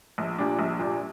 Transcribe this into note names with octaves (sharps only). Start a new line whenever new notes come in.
A#1
A#2 G3 D4
A#1
A#2 G3 D4